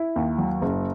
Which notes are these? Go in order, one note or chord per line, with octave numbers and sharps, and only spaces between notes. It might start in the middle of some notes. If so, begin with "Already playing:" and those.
Already playing: E4
D#2
F#3
F#1